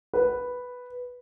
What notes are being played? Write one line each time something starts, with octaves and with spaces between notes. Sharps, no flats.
B4